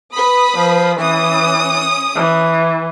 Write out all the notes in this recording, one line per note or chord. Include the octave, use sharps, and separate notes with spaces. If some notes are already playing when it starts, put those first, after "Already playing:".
B4 B5 D#6
F3
E3 C#4 D#6
E3